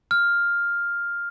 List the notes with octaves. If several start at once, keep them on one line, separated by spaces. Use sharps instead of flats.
F6